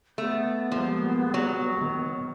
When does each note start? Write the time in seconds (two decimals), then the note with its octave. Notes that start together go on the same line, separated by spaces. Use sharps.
0.18 A3 B3
0.72 F3 G3 G#3 A#3
1.34 F#3
1.78 D#3